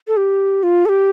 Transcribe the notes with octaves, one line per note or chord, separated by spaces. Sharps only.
A4
G4
F4
A4
G4